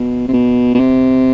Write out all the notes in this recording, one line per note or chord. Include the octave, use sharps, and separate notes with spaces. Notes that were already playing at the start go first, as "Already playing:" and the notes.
Already playing: B2
C3
B2
B2
C3